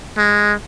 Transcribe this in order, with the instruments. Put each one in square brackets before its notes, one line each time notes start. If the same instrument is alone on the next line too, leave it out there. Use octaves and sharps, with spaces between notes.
[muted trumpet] G#3